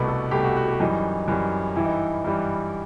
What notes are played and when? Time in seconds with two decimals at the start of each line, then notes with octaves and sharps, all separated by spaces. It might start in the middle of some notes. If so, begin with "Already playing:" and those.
Already playing: C2 B2 A3 B4
0.08 A4
0.31 C2 B2 A3 G4
0.43 F#4
0.56 F#4
0.68 G4
0.80 F#2 E3 G3 D#4
1.28 F#2 E3 G3
1.76 G2 E3 G3 E4
1.85 D#4
1.93 E4
2.24 G2 E3 G3